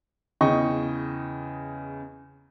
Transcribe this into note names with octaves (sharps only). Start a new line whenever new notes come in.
E2 C#3 D#5 G5 C#6